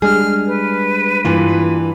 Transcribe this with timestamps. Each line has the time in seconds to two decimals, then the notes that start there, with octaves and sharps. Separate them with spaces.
0.02 G3 G#3 D4 G#4 F6
0.47 B4
1.25 G2 E3 A#3 F4